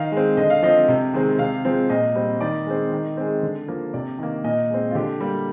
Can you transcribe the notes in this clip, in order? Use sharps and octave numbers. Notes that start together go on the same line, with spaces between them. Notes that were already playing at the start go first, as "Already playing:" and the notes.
Already playing: D#3 F5
G#3 C4
D3 D#5
F5
F3 C4 D#5
C3
D#3 G#3 C4
C3 F5
F3 G#3 C4
A#2 D#5
G3 C4
D#3 D5
G#3 C4
D#3
G#3 C4
D3
F3 A#3
C3 D5
D#3 A#3
A#2 D#5
G#3 C4
F4
D3 G4
G3 A#3